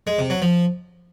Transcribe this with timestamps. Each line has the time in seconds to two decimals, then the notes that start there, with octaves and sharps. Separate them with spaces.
0.07 G#3
0.19 C3
0.30 F#3
0.42 F3